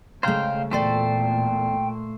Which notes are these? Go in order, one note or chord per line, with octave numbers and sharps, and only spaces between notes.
C#3 G#3 A3 C5 F5 G5 A#5
E2 A#2 A3 A4 C5 D5 G5